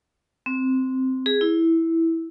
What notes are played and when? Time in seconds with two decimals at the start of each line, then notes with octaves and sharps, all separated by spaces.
0.46 C4
1.26 G#4
1.41 E4